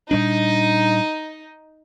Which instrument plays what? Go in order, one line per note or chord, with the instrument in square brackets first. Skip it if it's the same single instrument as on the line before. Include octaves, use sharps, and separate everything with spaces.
[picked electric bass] A#2 G3 D4 [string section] D#4